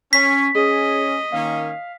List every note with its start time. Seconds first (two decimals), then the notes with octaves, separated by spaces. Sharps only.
0.13 C#4 C#6 B6
0.55 C#4 G#4 D#5
1.32 D#3 A#3 C#4 F5